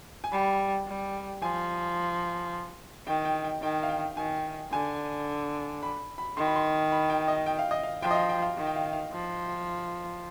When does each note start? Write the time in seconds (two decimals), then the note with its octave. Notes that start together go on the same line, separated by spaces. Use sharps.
0.24 G#5
0.32 G3 B5
0.87 G3
1.42 F3 G#5
3.07 D#3 G5
3.25 G5
3.44 G5
3.62 D#3 G5
3.83 F5
3.89 G5
4.17 D#3 G#5
4.72 D3 G#5
5.83 B5
6.18 B5
6.37 D#3 C6
6.47 B5
6.56 C6
6.92 B5
7.10 G5
7.28 D#5
7.46 G5
7.59 F5
7.71 D#5
7.83 F5
8.02 F3 G5
8.11 D#5
8.15 F5
8.29 G5
8.43 F5
8.57 D#3
8.67 G5
8.76 F5
8.93 F5
9.12 F3